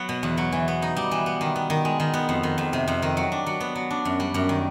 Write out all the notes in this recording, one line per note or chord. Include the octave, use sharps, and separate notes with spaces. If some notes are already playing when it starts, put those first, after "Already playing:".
Already playing: F#3 B3
B2
E2
F#3
E3
B3
D#4
G3
E3
B3
D#3
B3
D#3
G#3
D#3
B3
F2
D#3
F2
C3
F2
D#3
F#3
D4
F#3
B3
F#3
D4
F#2
G3
F#2
D#3